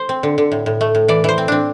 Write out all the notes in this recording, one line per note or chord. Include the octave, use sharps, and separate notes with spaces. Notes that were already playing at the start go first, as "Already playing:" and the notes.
Already playing: C5
C4
D3
D3
A2
A2
A3
A2
E3 D5
E3 C5
C4
C4 D4